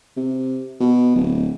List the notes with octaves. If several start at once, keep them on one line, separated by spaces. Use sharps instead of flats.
C3
B2
D1